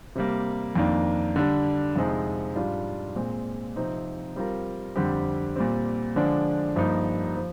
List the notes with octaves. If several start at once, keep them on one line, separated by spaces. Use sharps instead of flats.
C3 G3 A#3
F2 D#3 A#3 D4
D3 G3 D4
F2 C3 F3 G#3 D#4
G#2 G3 D4 F4
A#2 G#3 C4
C3 F3 C4 D#4
G3 C4 F4 A#4
F2 D3 G3 C4 G4
A#2 G3 C4
D3 F3 G#3 D4
G2 F3 A#3 D#4
F3